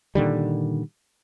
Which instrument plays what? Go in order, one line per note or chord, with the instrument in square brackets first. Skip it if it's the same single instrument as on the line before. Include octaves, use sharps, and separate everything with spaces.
[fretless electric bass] A#2 D3 D#3 G3